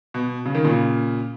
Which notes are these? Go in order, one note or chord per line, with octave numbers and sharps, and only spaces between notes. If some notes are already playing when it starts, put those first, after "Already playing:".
B2
C#3
D#3
A#2 C#3